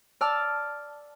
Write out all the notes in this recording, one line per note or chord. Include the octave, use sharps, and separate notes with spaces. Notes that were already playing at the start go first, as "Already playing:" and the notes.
D5 A5 E6 F6